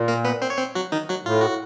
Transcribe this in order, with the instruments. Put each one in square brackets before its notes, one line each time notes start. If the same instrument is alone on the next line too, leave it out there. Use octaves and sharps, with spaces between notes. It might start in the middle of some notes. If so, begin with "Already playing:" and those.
Already playing: [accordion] A#2
[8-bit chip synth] A#3 A#4
B3 B4
C4 C5
C#5
C4 C5
F#3 F#4
D#3 D#4
F#3 F#4
[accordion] A2 [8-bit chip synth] F4
[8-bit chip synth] F#4